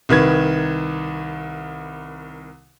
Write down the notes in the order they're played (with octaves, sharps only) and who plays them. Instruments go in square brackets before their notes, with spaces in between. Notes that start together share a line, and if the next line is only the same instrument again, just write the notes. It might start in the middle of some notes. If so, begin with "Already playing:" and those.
[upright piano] C2 D#3 B4 G#6